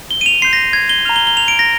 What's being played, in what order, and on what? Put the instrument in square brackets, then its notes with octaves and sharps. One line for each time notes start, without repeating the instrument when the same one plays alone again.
[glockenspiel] G7
D#7
F7
C6 G6 C7
A#6
G#6
G7
A#5 F6 F7
G7
G7
F7
D7
A#6